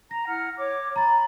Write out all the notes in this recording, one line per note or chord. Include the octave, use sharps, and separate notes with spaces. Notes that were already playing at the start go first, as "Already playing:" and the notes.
A#5 A#6
E4 F#5 F6
C#5 D6
A#5 B5 A6